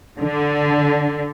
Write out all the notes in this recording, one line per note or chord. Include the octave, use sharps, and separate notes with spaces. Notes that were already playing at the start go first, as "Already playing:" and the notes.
D3